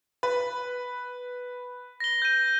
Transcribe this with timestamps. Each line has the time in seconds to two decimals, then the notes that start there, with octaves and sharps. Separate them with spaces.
0.23 B4
2.00 A#6 G7
2.22 G6 D#7